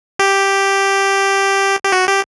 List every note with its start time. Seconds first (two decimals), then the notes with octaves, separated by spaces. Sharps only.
0.19 G4
1.84 G4
1.92 F#4
2.08 G4